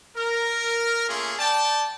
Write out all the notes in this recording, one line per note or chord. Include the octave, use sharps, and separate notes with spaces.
A#4
A3 A#3 C#4 F4 G#4
D5 G5 A5